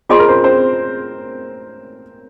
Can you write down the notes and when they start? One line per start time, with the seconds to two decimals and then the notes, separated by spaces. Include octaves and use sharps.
0.09 F4 G#4 C5 D#5 G#5 C6
0.19 A#4
0.29 C4 C5
0.44 C4 C5